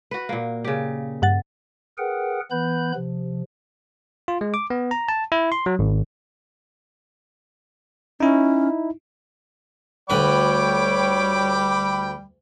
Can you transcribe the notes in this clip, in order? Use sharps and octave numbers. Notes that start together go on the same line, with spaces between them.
F#4 B4
A#2 A#3
C#3 G4
G2 F#5 A6
G#4 A#4 B4 F#5 G5
E3 B3 B4 B5 G6
C3 F3
F4
G#3
D6
B3
A#5
A5
E4
C6
F#3
G#1
C#4 D#4 E4
D2 G3 B4 C#5 G5 B5 D6